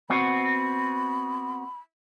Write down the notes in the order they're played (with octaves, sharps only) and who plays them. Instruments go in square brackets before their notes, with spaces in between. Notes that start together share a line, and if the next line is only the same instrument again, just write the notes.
[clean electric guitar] B3 C4 F#4 [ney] B5